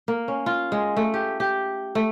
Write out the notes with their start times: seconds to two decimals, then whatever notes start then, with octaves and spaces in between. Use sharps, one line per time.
0.08 A#3
0.28 C#4
0.46 F4
0.72 G#3
0.97 A3
1.14 G4
1.40 G4
1.95 A3